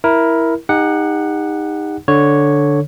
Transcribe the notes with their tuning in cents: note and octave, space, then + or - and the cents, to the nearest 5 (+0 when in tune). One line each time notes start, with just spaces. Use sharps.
E4 +0 A#4 +10
D#4 +0 G4 +40 F#5 +0
D3 +0 C#5 +0